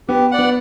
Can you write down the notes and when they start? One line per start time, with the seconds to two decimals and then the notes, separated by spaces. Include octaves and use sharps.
0.08 B3 G4
0.31 D5 F#5
0.39 B3